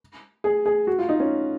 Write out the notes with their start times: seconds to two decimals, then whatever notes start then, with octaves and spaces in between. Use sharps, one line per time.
0.44 G#4
0.66 G#4
0.87 F#4
0.99 F4
1.09 D#4
1.20 C#4